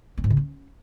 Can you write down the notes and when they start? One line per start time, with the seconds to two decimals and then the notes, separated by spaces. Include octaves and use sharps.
0.18 C4
0.24 G#2
0.30 C#3
0.37 C#4